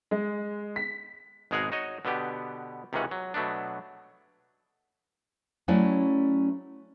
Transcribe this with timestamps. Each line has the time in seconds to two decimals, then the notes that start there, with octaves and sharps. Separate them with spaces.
0.11 G#3
0.76 B6
1.51 G#1 B2 G#3 G#4 A#4 F#5
1.72 D#4 F#4 C#5 D#5
2.05 B2 D3 B3 G4
2.93 C#2 C3 D#3 E3 C#4 F#5
3.11 F#3
3.34 B2 F#3 A3 B3 D4
5.68 F#3 A3 C#4 E4 D5